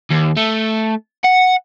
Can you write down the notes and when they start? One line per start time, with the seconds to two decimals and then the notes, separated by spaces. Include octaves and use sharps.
0.11 D#2
0.37 A3
1.25 F#5